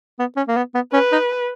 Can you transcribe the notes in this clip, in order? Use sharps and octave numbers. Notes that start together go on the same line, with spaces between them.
B3
C#4
A#3
B3
B3
C#4 B4
D#4